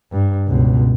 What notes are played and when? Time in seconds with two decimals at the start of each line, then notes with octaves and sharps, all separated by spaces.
0.12 G2
0.48 C#2 B2